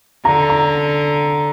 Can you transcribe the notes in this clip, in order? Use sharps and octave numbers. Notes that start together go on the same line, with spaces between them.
D3 A#5
A#5